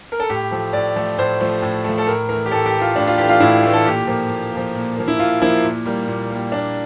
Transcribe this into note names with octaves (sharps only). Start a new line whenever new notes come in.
A#4
A4
A2 G4
F3 A3
A2 D5
F3 A3
A2 C5
F3 A3
A2
F3 A3
A4
A2 A#4
E3 A3 A#4
G4
A2 A4
G4
E3 A3
F4
A2 D4
F4
E3 A3 G4
F4
A2 E4
E3 A3
A4
A#2 G4
F3 A#3
A#2
A#3
F3
A#2
F3 A#3
E4
A#2 F4
F3 A#3 E4
A#2
G3 A#3
A#2
G3 A#3
A#2 D4